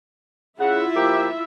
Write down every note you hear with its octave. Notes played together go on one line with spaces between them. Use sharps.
C#3 E4 F4 E5 F#5
F3 A#3 G4